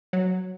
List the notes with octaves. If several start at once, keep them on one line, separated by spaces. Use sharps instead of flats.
F#3